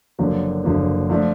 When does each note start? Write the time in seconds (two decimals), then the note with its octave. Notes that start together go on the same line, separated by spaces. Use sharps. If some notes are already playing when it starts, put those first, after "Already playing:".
0.19 F#1 F#2 D3 F3 A#3
0.64 F#1 F#2 D3 F3 A#3
1.09 D3 F3 A3 D4